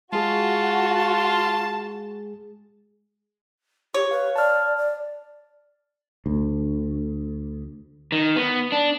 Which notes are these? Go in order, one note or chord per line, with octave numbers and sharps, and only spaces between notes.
G#3 F4 F#4 G#4 A5
G4 C#5
B4 F5
D5 A5 F6
D5
D2
D#3
B3
D4